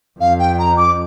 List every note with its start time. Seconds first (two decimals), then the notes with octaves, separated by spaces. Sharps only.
0.20 F2 F5
0.39 G5
0.58 A#5
0.77 D6